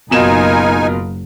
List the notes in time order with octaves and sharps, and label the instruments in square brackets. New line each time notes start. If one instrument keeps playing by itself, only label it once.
[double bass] F#1 [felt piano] B2 E7 [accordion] D#4 G#5 [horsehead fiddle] F4 A#4